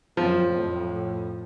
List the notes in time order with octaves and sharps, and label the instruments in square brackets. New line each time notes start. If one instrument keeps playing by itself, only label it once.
[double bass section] F#2 C4 [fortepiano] F3
[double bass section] F2 A2